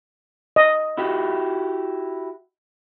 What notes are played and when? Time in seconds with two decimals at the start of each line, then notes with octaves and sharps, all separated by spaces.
0.56 D#5
0.97 E4 F#4 G4